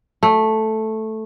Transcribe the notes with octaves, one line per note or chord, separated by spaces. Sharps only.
A3